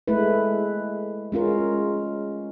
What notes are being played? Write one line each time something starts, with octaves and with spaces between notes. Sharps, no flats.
G#3 A3 E4 B4
G#3 C#4 F4 A#4